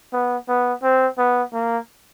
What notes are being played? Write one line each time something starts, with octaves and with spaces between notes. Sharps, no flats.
B3
B3
C4
B3
A#3